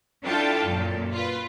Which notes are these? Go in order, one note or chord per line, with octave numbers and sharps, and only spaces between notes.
D4 E4 F4 A4 G5 A5
F#2 A#2
F4 B4